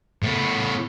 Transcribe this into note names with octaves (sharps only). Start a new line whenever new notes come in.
A2 B3